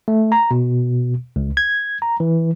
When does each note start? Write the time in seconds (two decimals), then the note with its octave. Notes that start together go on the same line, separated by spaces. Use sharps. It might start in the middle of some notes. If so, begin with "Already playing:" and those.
0.08 A3
0.32 A#5
0.51 B2
1.36 C#2
1.57 G#6
2.02 A#5
2.20 E3